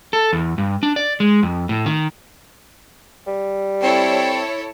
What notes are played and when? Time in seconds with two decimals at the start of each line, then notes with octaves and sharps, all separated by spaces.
0.13 A4
0.33 E2
0.58 G2
0.83 D4
0.96 D5
1.20 G#3
1.43 F2
1.69 A2
1.86 D#3
3.27 G3
3.83 C4 E4 A4 C#5